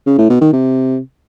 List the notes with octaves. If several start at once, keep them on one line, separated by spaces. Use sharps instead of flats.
C#3
A2
B2
D#3
C3